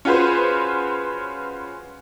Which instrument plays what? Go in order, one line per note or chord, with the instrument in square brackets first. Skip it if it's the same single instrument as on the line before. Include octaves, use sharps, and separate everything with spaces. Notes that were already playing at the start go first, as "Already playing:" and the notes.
[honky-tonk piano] C#4 F4 F#4 G#4 B4 C5